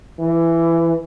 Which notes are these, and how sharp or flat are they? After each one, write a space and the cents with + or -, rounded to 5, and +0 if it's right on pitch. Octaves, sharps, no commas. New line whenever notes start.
E3 +15